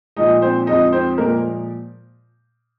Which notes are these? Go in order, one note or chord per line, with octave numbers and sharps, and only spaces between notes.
A#2 F3 G#3 D#4 D#5
C4 C5
F2 F3 G#3 D#4 D#5
C4 C5
A#2 F3 G#3 A#3 A#4